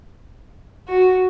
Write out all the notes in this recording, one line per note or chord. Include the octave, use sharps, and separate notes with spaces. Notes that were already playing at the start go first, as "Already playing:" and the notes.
F#4